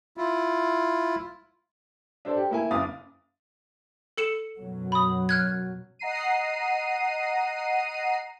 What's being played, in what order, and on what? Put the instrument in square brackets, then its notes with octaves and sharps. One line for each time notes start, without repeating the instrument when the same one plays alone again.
[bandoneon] E4 F4
[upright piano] D4 A4 C5 D5
G4
A#3 E4 G#5
F#1 F5 D6 D#6 A6
[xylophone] A4 C#7 E7
[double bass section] F#2 B2 F#3
[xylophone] B5 D#6
F6 F#6 G#6
[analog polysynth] D#5 F#5 A#5 C7 D#7